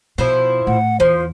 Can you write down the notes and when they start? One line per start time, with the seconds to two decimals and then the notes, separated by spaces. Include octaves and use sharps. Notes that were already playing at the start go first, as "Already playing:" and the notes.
0.18 B2 F3 E4 C5
0.67 A2 F#5
1.00 E2 F3 C5